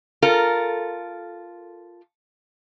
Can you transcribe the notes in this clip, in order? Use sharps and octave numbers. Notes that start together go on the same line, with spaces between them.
F4 A4 A#4